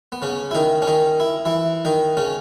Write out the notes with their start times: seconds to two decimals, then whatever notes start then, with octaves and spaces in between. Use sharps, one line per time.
0.12 B3
0.22 C#3 C#4
0.51 E4
0.55 D#3 D#4
0.82 C#4
0.87 D#3 D#4
1.20 E4
1.45 E3 E4
1.85 D#3 D#4
2.17 C#3 C#4